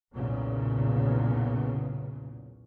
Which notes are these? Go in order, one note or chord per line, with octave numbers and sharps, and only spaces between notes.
B1 E2 A#2 C#3